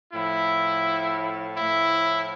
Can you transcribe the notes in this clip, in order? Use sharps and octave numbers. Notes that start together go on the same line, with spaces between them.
A2 F3 E4
A2 F3 E4